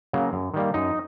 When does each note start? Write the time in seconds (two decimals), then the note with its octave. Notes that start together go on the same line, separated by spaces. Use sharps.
0.13 C#3 F#3 A#3
0.33 F#2
0.54 D#3 G3 A#3
0.74 F#2 D#4